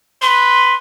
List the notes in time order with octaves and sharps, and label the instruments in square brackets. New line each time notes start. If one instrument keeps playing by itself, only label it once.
[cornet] B4 [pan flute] C6